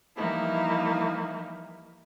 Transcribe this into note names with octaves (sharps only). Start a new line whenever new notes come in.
E3 F3 G3 A#3 D#4 E4